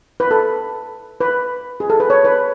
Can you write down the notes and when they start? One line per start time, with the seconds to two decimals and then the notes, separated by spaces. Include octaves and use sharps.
0.20 B4
0.31 A4
1.21 B4
1.80 G#4
1.90 A4
2.00 B4
2.10 C#5
2.25 B4